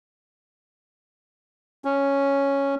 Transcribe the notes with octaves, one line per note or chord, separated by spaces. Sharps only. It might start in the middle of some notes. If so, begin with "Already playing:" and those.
C#4